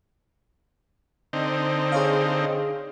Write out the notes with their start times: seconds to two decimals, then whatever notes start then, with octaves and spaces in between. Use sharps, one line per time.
1.33 D3 C4 D#4
1.92 G#4 C#5 F5